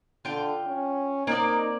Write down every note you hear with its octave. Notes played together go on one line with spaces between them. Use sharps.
D3 F4 G5
C#4
A#3 C4 D#4 D5